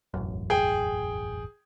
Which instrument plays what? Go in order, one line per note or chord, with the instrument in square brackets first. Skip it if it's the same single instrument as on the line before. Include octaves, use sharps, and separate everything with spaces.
[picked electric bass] E1 A1 F#2
[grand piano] G#4 G5